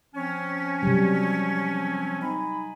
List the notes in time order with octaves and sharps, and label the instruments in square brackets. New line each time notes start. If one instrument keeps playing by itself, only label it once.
[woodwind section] F3 C4 C#4
[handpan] C3 F#3 G3
[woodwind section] D#4 G#5 B5